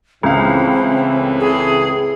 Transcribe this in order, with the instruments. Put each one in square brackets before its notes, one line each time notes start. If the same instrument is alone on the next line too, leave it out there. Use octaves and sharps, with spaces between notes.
[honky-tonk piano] C#2 F5 [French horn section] A2 E3 [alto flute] C4
[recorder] G#4